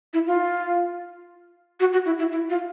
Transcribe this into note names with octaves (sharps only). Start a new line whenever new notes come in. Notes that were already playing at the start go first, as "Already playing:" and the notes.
E4
F4
F#4
F#4
E4
E4
E4
F4